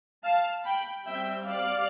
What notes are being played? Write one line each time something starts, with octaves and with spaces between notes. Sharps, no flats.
F5 A5
G5 B5
G3 C4 E5 G5
D5 F5